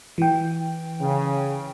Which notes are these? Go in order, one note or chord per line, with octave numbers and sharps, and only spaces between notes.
E3 G5
C#3